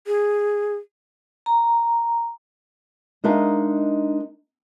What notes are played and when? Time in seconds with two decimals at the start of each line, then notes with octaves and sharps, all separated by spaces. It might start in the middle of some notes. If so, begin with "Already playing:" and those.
0.07 G#4
1.46 A#5
3.24 G#3 D4 D#4 A#4 E5 F5